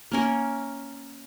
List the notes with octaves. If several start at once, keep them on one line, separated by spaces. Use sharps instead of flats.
A#3 C#4 A#4